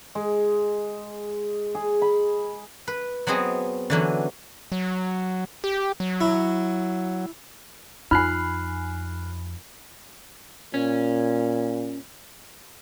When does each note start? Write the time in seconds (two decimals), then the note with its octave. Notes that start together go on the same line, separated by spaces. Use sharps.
0.15 G#3
1.75 G#4
2.02 B5
2.88 B4
3.27 F#3 B3 C4 G#4 D#5
3.90 D3 E3 F#3 C#4
4.72 F#3
5.64 G4
6.00 F#3
6.21 E4
8.11 F2 D#4 F4 G#5 B5 F6 F#6 C7
10.74 A#2 C#4